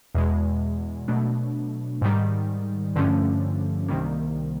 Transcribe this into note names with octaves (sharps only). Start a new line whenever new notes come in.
E2 B2 G#3
B2 F#3 A3 D4
G#2 D#3 G3
G2 D3 F3 A3 C#4
C2 C3 D#3 G3 A#3